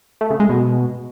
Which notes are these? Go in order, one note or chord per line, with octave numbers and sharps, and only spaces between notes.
A3
C#3
G#3
B2